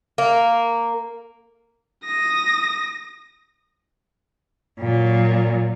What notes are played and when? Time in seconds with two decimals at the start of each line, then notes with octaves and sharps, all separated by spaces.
0.18 A#3
2.05 D#6 A#6
4.79 A#2 F#3